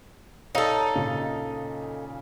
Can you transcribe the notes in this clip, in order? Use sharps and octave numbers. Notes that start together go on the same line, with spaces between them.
D#4 A4 C#5 D#5 F5
A#2 C#3